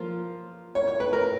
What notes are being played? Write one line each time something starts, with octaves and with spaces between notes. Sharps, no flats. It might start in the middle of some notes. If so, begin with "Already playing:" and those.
Already playing: F3 A#3 F4
C#5
C#5
B4
A#4